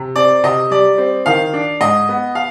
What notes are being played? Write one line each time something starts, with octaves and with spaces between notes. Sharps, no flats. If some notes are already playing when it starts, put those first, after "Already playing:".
Already playing: C3
C4 D5
C3 D#5
G3 D5
C4
D#3 F5
D4
G#2 D#5
B3
F5